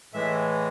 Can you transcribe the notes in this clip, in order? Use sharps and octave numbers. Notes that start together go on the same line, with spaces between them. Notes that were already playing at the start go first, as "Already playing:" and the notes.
A2 E3 G#3 E5